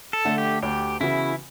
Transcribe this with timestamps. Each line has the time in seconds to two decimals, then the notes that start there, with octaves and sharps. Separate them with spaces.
0.13 A4
0.25 D3 A3
0.38 G4
0.63 D2 G4
1.00 C#3 E3 B3 E4 F#4